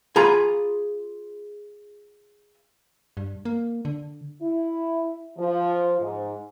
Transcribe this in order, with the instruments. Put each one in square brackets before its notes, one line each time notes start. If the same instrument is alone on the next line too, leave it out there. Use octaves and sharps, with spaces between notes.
[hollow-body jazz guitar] F4 G#4 A#5 B5
[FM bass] G2
A#3
D3
[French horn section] E4
F3
G#2